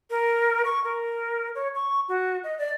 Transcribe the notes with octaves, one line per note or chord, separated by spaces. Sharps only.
A#4
C#6
A#4
C#5
C#6
F#4
D#5
D5